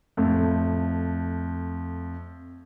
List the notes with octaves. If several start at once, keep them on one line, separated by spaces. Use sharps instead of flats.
F2 A2